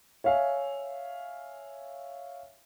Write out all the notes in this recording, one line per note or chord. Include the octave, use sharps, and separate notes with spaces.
C#5 E5 F5 G#5